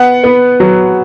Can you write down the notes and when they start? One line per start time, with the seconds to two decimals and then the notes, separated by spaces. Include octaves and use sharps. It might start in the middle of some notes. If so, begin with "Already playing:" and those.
Already playing: B3 F#5
0.24 B3
0.60 F#3